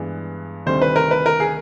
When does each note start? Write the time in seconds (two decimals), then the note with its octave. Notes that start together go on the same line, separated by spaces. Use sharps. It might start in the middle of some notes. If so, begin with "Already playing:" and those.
Already playing: G2 E3 G#3 B3
0.66 D2 C3 D#3 G3 C5
0.82 B4
0.96 A#4
1.11 B4
1.26 A#4
1.40 G#4